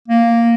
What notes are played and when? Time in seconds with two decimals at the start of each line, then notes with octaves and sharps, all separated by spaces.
0.08 A#3